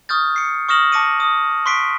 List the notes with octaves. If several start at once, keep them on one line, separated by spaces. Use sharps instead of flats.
C#6 D#6 F6 G6 A6
C7 C#7
C#6 D#6 F6 A#6 E7 F#7
A5 D6 A#6 C#7 D#7 F#7
D#6
C6 C#6 F#6 B6 C7 D7